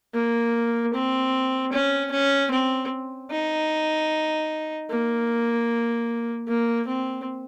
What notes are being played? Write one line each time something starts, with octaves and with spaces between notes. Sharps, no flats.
A#3
C4
C#4
C#4
C4
D#4
A#3
A#3
C4